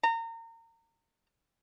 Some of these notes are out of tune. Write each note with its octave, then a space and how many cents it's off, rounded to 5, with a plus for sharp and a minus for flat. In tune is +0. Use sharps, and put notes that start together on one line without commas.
A#5 -30